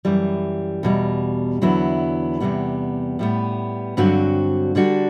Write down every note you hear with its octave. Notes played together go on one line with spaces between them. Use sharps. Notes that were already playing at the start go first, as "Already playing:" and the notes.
F#2 E3 G3
E2 B2 G3
E2 D3 F#3 B3 E4
E2 C3 G3 B3
A2 G3 B3
G2 D3 F#3 C4 F#4
D3 G3 D4 F#4